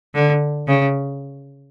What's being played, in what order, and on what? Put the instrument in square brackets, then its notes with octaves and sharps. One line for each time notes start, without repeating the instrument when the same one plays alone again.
[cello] D3
C#3